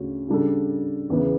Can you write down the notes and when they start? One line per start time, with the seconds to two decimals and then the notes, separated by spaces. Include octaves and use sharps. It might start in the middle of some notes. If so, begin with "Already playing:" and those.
Already playing: D2 C#3 C#4
0.28 C#3 G3 D4 A4
1.10 E2 C#3 E3 B3